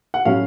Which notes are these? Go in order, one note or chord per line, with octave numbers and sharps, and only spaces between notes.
F#5
A2 F#3 C#4 F5